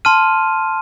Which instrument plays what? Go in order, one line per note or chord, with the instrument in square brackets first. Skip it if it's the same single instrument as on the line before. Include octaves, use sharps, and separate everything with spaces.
[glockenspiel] A5 C6 F6 D#7